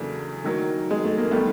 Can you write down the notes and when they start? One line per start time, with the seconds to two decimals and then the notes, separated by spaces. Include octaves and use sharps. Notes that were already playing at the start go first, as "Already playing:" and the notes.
Already playing: E2 C#3 F#3 A3 A#3 D4
0.44 D#3 F#3 A#3
0.91 G#3
1.05 A3
1.18 A#3
1.31 D#3 G3 A3 B3 C4